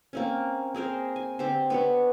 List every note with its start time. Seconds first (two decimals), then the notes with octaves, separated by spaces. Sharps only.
0.13 A#3 C4 C#4
0.74 C4 G#4 A#4 C5
1.16 G#5
1.39 D3 C4 G4 C5
1.70 B3 D4 C#5